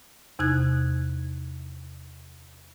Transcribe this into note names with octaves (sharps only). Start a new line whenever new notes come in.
E2 C3 D#4 F#6 G#6